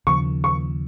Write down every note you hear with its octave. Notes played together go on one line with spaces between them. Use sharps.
D#2 C#3 F3 A#3 C#6
C#6